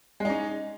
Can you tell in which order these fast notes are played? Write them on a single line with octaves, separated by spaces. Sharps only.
G#3 D#4 C#4